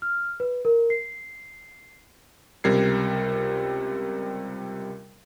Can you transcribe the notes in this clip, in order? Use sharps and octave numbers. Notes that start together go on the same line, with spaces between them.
F6
B4
A#4
C7
C#2 C3 G3 A#4 G#6 C7